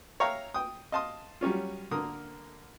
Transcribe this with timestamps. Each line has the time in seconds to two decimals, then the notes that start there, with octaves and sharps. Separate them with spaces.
0.20 C#5 E5 F5 G5 A#5
0.54 G5 D#6
0.92 D#5 F5 A5 C6 D#6
1.41 F#3 G3 C#4 F4
1.91 D3 A#3 A#4 D#6